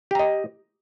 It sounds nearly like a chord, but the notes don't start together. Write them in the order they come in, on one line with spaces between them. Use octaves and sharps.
G4 A#5 D#5